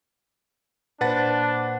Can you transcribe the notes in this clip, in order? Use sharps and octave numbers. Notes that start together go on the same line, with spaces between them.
A#2 D4 B4 C5 F#5 A6